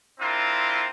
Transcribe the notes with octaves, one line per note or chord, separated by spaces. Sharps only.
C4 D4 E4 F4 A#4